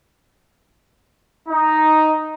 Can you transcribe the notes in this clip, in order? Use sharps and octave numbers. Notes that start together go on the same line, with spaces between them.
D#4